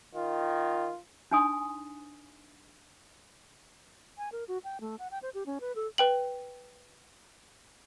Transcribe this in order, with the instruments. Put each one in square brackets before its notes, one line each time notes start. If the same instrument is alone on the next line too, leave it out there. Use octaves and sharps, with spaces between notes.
[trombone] D#3 [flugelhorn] F4
[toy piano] D4 D#4 G#5 C6 D#6
[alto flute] G#5
A#4
F#4
G5
A3
F#5
G5
C5
G4
C#4
B4
A4
[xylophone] B4 G5 F#7